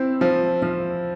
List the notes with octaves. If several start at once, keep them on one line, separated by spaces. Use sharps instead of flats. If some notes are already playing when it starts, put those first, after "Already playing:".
Already playing: C4 E4
F3
F3